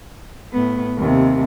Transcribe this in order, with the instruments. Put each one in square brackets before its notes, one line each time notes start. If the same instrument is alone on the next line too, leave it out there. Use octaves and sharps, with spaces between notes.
[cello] A2 B3
D#2 C3